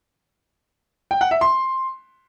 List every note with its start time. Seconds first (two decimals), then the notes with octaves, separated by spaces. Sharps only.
1.11 G5
1.21 F#5
1.31 E5
1.41 C6